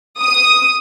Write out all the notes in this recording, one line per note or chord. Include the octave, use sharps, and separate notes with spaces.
D#6